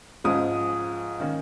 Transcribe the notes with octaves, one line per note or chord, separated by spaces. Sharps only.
G#2 F3 G#3 C#4 D#6
D#3 A#3 C#4